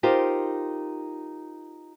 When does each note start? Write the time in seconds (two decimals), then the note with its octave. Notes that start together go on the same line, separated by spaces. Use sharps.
0.03 D#4 F4 G4 A#4 C5